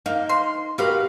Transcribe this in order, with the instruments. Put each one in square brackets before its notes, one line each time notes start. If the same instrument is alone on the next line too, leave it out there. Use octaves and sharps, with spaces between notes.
[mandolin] A#3 [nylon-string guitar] D#4
[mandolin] C6
[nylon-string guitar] F#4 G4 A#4 [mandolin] B4 F5